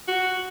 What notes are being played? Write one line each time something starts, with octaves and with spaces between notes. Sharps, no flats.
F#4